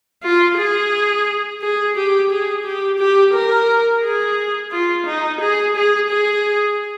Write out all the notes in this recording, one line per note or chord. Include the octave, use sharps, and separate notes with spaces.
F4
G#4
G#4
G4
G#4
G4
G4
A#4
G#4
F4
D#4
G#4
G#4
G#4